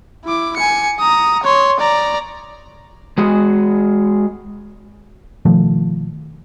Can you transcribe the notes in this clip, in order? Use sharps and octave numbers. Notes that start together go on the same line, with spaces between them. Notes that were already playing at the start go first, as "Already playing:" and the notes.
E4 D6
G#5 C#7
A#5 D#6
C#5 C6
D5 A#5
G#3 F#4 G#4
B2 D#3 F3 A3